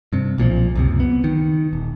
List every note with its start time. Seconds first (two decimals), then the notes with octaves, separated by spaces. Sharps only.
0.13 G2 C3
0.38 B1 A#2 E3 F3
0.75 C#2 F#2 C3
1.00 B3
1.24 D#3
1.73 D#1